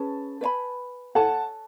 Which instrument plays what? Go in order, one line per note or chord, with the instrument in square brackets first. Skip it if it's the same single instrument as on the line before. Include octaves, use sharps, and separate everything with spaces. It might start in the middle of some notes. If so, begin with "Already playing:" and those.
Already playing: [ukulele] C#4 G#4 B4 [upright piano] A5
[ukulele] B4 D5 G#5 B5
[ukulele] A4 C#5 G#5 [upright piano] F#5 A5